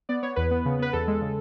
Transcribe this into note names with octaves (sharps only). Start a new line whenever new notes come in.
B3 D5
B3 C#5
E2 B4
B3
C#3
B3 B4
E2 A4
G#3
C#3